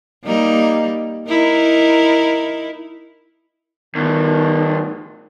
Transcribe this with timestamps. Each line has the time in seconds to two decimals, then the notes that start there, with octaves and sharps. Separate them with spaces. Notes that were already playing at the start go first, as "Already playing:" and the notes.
0.24 G3 A#3 D#4
1.28 D#4 E4 A#4
3.95 E2 A2 D#3